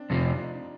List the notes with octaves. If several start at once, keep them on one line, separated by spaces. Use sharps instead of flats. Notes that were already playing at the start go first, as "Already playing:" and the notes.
Already playing: C4 D4
F2 C3 F3 F4
D#4
D4
D#4